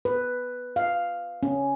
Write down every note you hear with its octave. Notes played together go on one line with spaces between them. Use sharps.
B4
F5
C#4